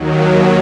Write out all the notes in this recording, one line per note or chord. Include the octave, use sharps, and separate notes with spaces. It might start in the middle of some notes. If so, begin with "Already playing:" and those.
Already playing: D#2 D#3 F#3